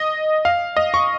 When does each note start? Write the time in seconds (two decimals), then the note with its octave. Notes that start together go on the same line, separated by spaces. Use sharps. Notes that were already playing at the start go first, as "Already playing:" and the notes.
Already playing: D#5
0.45 F5
0.77 D#5
0.94 C#6